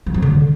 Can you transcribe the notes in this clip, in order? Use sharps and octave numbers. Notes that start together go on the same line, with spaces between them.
F3
F#3
D3